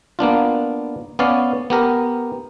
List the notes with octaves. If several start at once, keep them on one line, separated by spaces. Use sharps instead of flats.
A#3 B3 D4 F4
B3 C#4 D5 F5
B3 G4 A#4